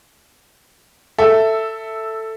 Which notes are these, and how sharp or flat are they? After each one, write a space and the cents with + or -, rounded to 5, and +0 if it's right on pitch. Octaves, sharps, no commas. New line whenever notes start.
A4 +10 E5 +0